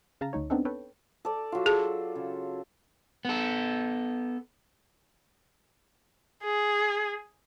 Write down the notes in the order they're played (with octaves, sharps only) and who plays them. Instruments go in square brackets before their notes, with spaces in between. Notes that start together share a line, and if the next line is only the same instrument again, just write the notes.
[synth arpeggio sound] C#3 F5 A5 A#5
D2 D#4 C#5
B3 C4 D4 D#4 A4
A4 B4 C#5 G5
[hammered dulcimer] A4 D5
F#3 F4
[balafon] G#4 [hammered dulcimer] A4
[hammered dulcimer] C#3
[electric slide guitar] B3 A4
[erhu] G#4